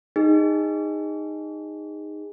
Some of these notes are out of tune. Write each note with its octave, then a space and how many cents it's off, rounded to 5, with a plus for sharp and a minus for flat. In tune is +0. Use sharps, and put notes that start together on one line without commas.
D#4 -5 G#4 -25